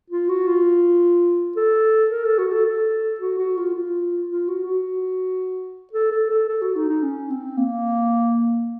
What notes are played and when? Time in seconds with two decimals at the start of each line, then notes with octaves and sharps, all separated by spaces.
0.10 F4
0.28 F#4
0.47 F4
1.56 A4
2.11 A#4
2.24 A4
2.38 F#4
2.52 A4
2.65 A4
3.20 F#4
3.38 F#4
3.57 F4
3.74 F4
4.29 F4
4.48 F#4
4.66 F#4
5.93 A4
6.11 A4
6.30 A4
6.48 A4
6.61 F#4
6.75 D#4
6.89 D#4
7.02 C#4
7.30 C4
7.57 A#3